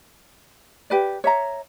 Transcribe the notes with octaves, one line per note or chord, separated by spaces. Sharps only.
G4 B4 D5
C#5 E5 A#5